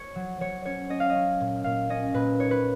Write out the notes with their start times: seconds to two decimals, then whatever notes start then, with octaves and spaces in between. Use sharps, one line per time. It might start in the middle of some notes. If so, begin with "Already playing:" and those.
Already playing: C#5
0.15 F#3
0.40 F#3 C#5
0.65 C#4 C#5
0.90 C#4 D#5
1.00 F5
1.09 D#5
1.15 C#4
1.40 A#2
1.64 A#2 F5
1.89 C#4 D#5
2.14 A#2 B4
2.39 D#4 C#5
2.51 B4